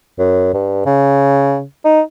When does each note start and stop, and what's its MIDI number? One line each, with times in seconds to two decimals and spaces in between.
0.19 0.52 42
0.54 0.83 43
0.85 1.63 49
1.85 2.01 63